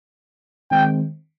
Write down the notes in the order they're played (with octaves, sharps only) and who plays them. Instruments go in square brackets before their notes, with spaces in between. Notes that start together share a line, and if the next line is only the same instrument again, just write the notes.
[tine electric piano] D#3 G#3 C4 [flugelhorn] G5